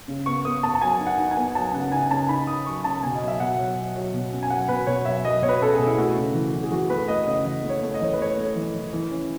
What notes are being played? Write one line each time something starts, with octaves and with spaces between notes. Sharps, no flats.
C#3
B3 C#6
B3 D#6
B3 A5
A5
F#3 G#5
D#4
F#5
D#4
G#5
B3
F#3 A5
C#3 F#5
D#4 G#5
C#3 A5
D#4 B5
D#4 D#6
F#3 C#6
C#3 A5
B2 G#5
D#5
F#3
E5
B2 F#5
F#3
F#3
F#3
B2
C#4
G#5
F#3 F#5
B2 B4
B2 C#5
F#3 E5
F#3 D#5
B2 C#5
B4
C#4 A4
G#4
B2
E4
A3 F#4
C#3
E3
E3
G#4
E3 F#4
A3 B4
A3 D#5
C#3 D#5
E3 D#5
A3
C#5
A3
D#5
E3 C#5
B4
A3 C#5
A3
E3
E3
E3
C#4